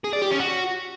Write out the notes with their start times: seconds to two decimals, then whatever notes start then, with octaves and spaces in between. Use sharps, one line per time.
0.04 G#4
0.13 D5
0.22 G4
0.31 C#4
0.40 F#4